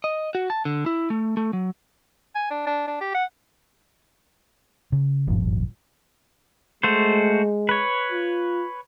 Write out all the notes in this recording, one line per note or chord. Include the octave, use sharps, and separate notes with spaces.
D#5
F#4
A5
D3
E4
A3
A3
F#3
G#5
D4
D4
D4
G4
F#5
C#3
D#1 G#1 G2 F3
G#3 A3 F#4 C5
B4 C#5
F4